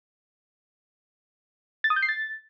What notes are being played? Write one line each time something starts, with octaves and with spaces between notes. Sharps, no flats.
A6
D#6
G6
C7
A6